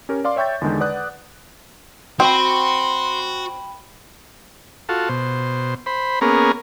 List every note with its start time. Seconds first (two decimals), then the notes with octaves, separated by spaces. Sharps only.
0.09 C#4 G4 A#4 C#5
0.24 D5 F5 C6 D6
0.36 C#5 E5 G5 C#6 G6 A6
0.61 E2 D3 D#3 G#3
0.80 B4 D5 F#5 D#6 F#6
2.20 C4 F#4 G5 B5 C6
4.89 F4 F#4 A4
5.09 B2 C5
5.86 C5 B5
6.21 A#3 B3 C#4 G#4 A#4